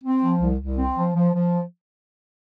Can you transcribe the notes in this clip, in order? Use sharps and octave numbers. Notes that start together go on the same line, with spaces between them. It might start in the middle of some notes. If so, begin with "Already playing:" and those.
C4
F3
C2
C2
C4
F3
F3
F3